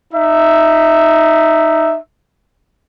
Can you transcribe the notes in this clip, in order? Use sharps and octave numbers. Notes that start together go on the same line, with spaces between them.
D#4 E5